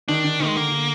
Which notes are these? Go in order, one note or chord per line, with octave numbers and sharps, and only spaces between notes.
D#3 D4
D#3
D#3
G#3
D3 A#3
D3